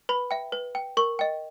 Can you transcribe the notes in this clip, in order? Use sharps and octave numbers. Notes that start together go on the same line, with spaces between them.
B4 B5
E5 G5
B4
G5
A#4 C#6
D#5 G5